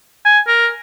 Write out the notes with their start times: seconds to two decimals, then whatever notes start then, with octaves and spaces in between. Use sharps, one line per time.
0.25 G#5
0.47 A#4